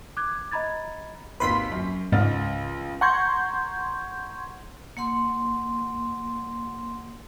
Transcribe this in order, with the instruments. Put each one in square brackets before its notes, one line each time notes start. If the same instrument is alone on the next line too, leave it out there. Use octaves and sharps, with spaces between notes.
[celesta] D6 F#6 G#6
D#5 A#5 B5 G#6 A6
[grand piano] G#1 D#2 B4 [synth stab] B5 C6 B6
[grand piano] F#2
[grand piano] C#2 F6 A6 [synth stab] G#2
[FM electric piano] F#5 A#5 C6 C#6 G6 G#6
[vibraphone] A#3 F#5 C6